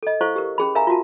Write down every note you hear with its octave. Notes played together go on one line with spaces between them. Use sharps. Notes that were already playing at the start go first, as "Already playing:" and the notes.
A4 D#5
E4 A4 C5 F5 C#6
G4 A#4
C#4 G#4 B5
A#4 E5 F5 G#5 A#5
F4 F#4 A5